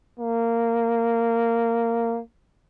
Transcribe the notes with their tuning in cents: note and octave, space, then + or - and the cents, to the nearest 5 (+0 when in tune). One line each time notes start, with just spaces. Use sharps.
A#3 -15